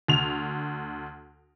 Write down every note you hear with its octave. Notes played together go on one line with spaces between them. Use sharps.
D2 F7